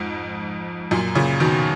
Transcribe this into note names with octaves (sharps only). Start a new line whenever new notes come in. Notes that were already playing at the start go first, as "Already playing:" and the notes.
Already playing: F2 G#2
F#2 A#2
A#2 C#3
B2 D#3